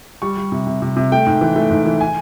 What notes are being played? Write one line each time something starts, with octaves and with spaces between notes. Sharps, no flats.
G3 C#6
G3
C3
C3
C3
C3
A3 G5
G#2
E3
A3
G#2
E3
G#5